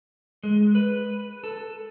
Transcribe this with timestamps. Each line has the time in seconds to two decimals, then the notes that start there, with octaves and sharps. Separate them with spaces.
0.43 G#3
0.75 B4
1.44 A4